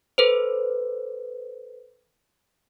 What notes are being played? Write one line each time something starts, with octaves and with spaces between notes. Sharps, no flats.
A4 B4 C5